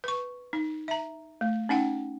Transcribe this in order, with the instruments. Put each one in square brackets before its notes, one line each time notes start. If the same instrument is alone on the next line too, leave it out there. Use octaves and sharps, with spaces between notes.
[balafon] B4 C#6
D#4
E5 A#5
A3
C#4 D#4 F#5 G5